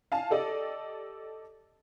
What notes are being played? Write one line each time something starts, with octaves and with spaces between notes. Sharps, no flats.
F5 G#5 A5
G4 A4 D5 D#5